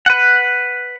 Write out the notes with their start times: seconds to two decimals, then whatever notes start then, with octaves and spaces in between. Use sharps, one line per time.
0.06 B4 F#5